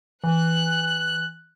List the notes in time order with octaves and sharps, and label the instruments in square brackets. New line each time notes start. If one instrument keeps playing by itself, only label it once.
[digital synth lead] E3 [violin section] F#6